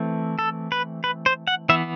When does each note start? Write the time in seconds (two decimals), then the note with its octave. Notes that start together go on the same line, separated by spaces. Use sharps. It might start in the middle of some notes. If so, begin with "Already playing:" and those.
Already playing: E3 A3 C4
0.39 A4
0.72 B4
1.04 B4
1.26 C5
1.47 F#5
1.69 E3 B3 E5